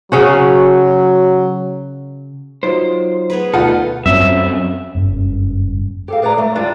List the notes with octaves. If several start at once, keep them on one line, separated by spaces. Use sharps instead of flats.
C#3 F#3 C#4 F#4
F#3 D#4 F4 C5
B3 G#4 B4
D2 B2 D#4 F4 A4 F#5
F#2 C4 C#4 E5
F#1 G2 C#4
G4 A4 F5
G#4 B4 D5 F#5 A#5
A3
E2 G3 D4 F4